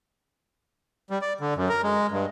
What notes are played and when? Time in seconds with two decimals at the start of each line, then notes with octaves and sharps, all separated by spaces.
1.10 G3
1.22 D5
1.40 D3
1.56 F#2
1.69 A#4
1.83 G#3
2.11 G2